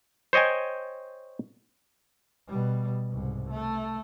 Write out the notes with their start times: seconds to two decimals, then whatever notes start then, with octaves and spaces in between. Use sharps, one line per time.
0.33 C5 C#5 D#5 G5 G#5
2.48 B2 G3
3.08 C2 G#2
3.50 A3